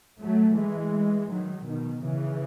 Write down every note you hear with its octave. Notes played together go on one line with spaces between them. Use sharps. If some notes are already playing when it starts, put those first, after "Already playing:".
F#3 A3
E3 G#3
D#3 F#3
B2 D#3
C#3 E3